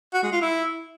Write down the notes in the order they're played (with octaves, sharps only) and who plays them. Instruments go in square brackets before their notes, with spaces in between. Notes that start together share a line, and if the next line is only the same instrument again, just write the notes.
[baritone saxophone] F#4
G#3
F4
E4